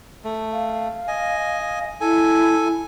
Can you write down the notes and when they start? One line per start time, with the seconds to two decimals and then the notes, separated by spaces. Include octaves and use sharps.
0.24 A3
0.52 F5
1.08 D#5 G#5
2.01 E4 A4 G#5